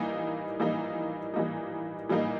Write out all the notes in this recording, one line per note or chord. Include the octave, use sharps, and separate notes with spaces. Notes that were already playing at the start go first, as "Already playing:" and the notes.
Already playing: E3 G3 A#3 D#4
E3 G3 A#3 D#4
E3 G3 A#3 D#4
E3 G3 A#3 D#4